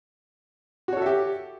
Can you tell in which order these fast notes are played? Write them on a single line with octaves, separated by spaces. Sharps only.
F#4 C#5 A4 E5 G4